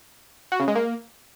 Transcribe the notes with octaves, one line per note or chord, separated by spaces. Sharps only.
F#4
C#3
G#3
A#3